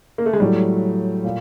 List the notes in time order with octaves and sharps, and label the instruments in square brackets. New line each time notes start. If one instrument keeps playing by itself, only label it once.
[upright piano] A#3
A3
G#3
[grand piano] A2 F#3 A3 [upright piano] G3
[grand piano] A#2